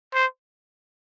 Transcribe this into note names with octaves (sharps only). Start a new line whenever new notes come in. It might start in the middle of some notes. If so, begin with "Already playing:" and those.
C5